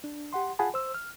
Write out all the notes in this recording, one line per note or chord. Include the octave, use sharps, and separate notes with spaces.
D4
G4 F#5 C6
F4 G#4 F#5 G#5 A5 B5
C5 E6
F6